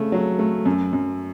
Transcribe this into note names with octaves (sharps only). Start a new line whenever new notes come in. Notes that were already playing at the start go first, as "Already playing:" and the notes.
Already playing: C#3 A3
F#3
A3
F#2
F#2